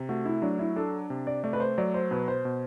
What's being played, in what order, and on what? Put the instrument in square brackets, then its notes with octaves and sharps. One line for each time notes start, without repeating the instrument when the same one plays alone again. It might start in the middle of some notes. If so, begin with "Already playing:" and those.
Already playing: [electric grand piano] C3
[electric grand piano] A3 [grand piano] F#4
[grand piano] E4
[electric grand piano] F#3 [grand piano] D4
[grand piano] E4
[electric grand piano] D4 [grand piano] A4
[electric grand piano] C3
[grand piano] D5
[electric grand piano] A3 [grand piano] D5
[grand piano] B4
C5
[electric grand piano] F#3 [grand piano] D5
[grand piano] C5
[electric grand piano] B2 [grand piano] B4
[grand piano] C5
[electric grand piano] B2